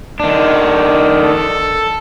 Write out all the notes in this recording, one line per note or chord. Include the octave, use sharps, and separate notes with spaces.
D#3 D4
A4